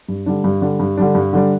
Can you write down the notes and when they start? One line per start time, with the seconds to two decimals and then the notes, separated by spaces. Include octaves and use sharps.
0.08 G2
0.26 D3 G3 D4
0.44 G2
0.62 D3 G3 D4
0.80 G2
0.97 D3 G3 D4
1.15 G2
1.33 D3 G3 D4